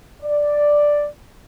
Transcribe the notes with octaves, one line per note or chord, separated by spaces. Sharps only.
D5